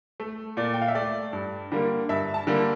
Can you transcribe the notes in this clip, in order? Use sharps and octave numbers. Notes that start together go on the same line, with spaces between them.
A3
A#2 D5
G5
F5
E5
A3 D5
G2
D3 G3 A#3
G2 E5
A5
D3 G3 A#3